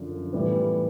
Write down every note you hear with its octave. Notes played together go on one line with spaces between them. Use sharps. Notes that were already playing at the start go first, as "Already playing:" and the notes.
Already playing: F#2 D3 F3
A2 E3 G3 B3